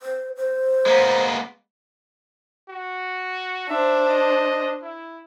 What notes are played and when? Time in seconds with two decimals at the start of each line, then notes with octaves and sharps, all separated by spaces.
0.01 C5
0.36 C5
0.86 G#3 A#3 B3
2.69 F#4
3.69 D4 C5 E5
4.09 D#5
4.82 E4